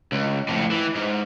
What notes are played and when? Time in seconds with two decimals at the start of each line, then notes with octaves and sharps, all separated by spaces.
0.12 C#2
0.48 F2 A2
0.71 E3
0.95 G#2